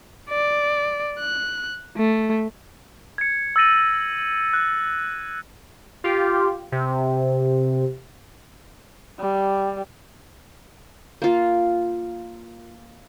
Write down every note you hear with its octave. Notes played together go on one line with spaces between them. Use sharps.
D5
F#6
A3
G#6 C#7
E6 G6 A6 A#6 D#7 F#7
F#6
F4 G4
C3
G3
A#3 F4